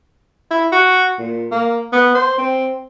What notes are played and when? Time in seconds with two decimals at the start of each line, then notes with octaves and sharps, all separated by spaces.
0.51 E4
0.72 F#4
1.19 A#2
1.51 A#3
1.93 B3
2.15 C5
2.38 C4